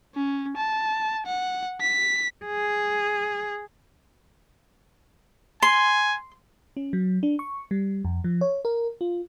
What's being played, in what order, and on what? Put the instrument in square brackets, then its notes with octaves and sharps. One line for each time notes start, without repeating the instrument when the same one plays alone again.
[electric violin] C#4
A5
F#5
B6
[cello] G#4
[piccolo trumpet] G#5 [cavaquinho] C6
[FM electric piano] C#4
F#3
D4
C#6
G3
F2
F3
C#5
A#4
F4